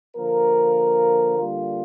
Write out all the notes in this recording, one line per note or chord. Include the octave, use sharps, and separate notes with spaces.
D3 F3 A#3 A#4
D3 G3 A#3 F4